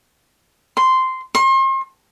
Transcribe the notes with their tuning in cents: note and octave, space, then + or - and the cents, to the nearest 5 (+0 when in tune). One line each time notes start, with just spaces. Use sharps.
C6 -10
C6 +40